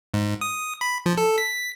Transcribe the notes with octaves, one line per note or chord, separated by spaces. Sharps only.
G#2
D#6
B5
F3
A4
B6